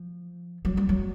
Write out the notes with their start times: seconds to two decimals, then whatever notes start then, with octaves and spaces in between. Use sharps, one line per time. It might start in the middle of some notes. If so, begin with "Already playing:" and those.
Already playing: F3
0.65 F#3
0.77 G3
0.89 F#3